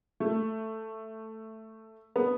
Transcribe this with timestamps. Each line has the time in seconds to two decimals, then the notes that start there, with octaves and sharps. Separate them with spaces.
0.20 A3
2.16 B3